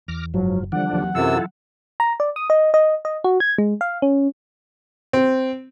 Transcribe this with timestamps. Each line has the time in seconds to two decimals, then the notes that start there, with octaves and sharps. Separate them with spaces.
0.08 E2 D6 F6 A#6
0.34 F#1 G#2 F3 F#3
0.72 D3 E3 F3 G3 D4 F#5
0.91 D#2 E3 F#3 C4
1.15 F#2 C3 E4 F4 A4 E6
2.00 A#5
2.20 D5
2.36 D#6
2.50 D#5
2.74 D#5
3.05 D#5
3.24 F#4
3.40 G#6
3.58 G#3
3.81 F5
4.02 C#4
5.13 C4